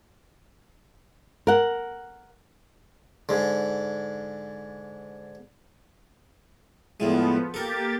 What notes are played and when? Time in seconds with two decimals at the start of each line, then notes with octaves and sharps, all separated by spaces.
1.47 A#4 F#5
3.29 G#2 D3
7.00 E2 A2 F3 G#3 B3
7.54 A#3 G4 A4 A#4 A6